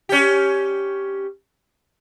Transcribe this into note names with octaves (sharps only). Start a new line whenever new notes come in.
C#4 G4